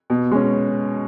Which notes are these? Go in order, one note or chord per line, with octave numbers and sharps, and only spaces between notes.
B2
G#3 C#4